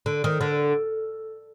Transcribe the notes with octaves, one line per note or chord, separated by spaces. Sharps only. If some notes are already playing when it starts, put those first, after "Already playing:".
D3
D#3
D3